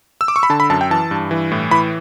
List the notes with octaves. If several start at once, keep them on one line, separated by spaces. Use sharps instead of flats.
E6
D6
C#6
B5
D3 A5
B5
F#2 A5
G5
E3 A5
G2
E3
A2
E3 B5